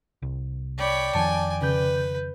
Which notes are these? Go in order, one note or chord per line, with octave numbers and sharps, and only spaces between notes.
C2
C#5 D5 G5 B5
F2 D#3 F3 G#5 A5
C#3 B4 G6